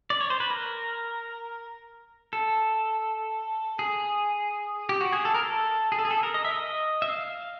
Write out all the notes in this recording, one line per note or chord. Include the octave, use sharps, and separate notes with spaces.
D5
C#5
C5
B4
A#4
A4
G#4
G4
F#4
G#4
A4
A#4
A4
G#4
A4
G#4
A4
A#4
D#5
E5
D#5
E5
F5